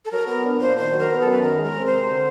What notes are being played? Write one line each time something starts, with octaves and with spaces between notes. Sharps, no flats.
A4
F#3 A#4
B3 A#4
D4
A#2 C5
D#3 C5
F#3
A#4
B3
A4
F#2
B4
D#3 A#4
G#3
A#4
C4
C5
C3
D3